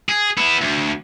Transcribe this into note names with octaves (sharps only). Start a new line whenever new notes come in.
G#4
B3 E4
D2